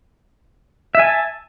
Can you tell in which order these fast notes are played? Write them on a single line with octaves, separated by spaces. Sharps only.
E5 G#5 A5